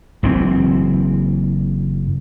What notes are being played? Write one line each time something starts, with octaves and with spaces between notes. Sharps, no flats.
F#1 E3 C4